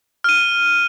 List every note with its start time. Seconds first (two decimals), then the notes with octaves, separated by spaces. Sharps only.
0.24 F6 D#7